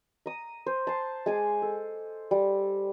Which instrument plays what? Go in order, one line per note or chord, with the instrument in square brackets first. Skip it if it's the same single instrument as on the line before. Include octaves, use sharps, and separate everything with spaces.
[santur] A#5 D#6
C5
A5 C6
G#3 G#5 D6
A4
G3